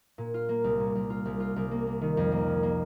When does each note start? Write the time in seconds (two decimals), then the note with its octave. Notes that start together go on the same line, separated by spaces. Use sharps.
0.18 A#2
0.34 F4
0.49 A#3
0.64 C2
0.80 A#2
0.95 C2
1.10 F4
1.25 C2
1.40 F4
1.56 C2
1.71 A#3
1.87 A#3
2.01 D#3
2.17 F2
2.32 A#3
2.48 D#3
2.63 A#3